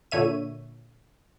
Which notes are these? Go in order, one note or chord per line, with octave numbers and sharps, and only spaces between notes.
A#2 D3 C#5 E5 D#7